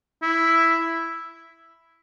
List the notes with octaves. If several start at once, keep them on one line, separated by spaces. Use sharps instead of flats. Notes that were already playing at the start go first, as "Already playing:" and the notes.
E4